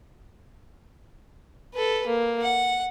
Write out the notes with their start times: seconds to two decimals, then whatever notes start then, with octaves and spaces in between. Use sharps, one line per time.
1.74 A4 B4
2.07 A#3
2.42 F#5